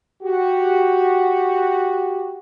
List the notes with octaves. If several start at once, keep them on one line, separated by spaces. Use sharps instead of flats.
F#4 G4